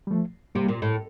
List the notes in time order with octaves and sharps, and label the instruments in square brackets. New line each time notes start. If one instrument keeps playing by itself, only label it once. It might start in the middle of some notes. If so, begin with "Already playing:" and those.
[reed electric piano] G3
F3 A3
[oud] C3 [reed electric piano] G3 A#3
[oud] A#2
A2